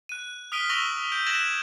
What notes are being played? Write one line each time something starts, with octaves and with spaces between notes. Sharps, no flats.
F#6 D#7
D#6 F6 B6 D7 D#7 G7
C#6 E6 A#6 D#7 F7 G7
G6 D7
F#6 G#6 A#6 D7 E7 F#7